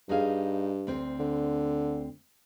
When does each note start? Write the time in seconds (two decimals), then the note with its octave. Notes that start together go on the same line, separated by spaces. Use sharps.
0.09 G2 D#4 G#4 F5
0.87 D2 C4 C5
1.20 D3